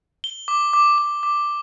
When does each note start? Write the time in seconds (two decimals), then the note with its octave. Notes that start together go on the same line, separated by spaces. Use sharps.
0.24 G7
0.48 D6
0.73 D6
0.98 D6
1.23 D6